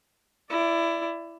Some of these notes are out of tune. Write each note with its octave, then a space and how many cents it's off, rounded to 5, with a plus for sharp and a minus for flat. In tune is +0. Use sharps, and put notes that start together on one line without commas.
E4 +20 D5 +0